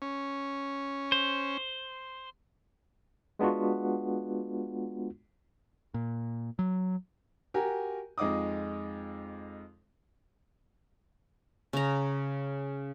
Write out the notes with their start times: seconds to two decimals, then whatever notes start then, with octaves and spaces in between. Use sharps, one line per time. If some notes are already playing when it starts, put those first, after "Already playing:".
0.02 C#4
1.12 C5
3.39 G#3 B3 D4 F4 F#4
5.94 A#2
6.59 F#3
7.54 F#4 G4 A#4 G#5
8.18 F2 G#3 D#4 D6 D#6
11.73 C#3 A#5